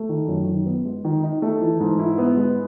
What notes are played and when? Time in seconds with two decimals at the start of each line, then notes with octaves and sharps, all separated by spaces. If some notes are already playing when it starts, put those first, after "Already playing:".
Already playing: A3
0.09 D#3
0.28 F#2
0.47 D#3
0.66 B3
0.85 G#3
1.05 D#3
1.23 D#4
1.42 A3
1.61 E3
1.80 G#2
1.99 E4
2.18 B3
2.37 G#3